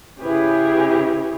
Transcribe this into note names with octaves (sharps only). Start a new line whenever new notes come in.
C#3 C#4 E4 G4 G#4 B4